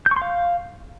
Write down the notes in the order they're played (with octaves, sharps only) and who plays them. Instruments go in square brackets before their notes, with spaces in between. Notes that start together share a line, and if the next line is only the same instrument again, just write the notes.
[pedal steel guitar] G6
C#6
C6
F5